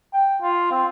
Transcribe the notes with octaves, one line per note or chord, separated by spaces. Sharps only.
G5
F4
C4